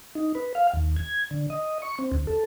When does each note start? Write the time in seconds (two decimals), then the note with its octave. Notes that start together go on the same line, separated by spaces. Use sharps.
0.15 D#4
0.35 B4
0.55 F5
0.74 D#2
0.96 G#6
1.31 D3
1.50 D#5
1.82 C#6
1.99 C4
2.12 D2
2.27 A4